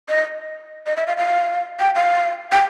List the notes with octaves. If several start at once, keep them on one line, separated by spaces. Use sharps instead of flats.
D#5
D#5
E5
F5
F5
G5
F5
G5